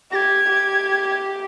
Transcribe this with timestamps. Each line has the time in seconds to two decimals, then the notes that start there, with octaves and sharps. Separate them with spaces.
0.12 G4 G#6 A#6
0.49 G4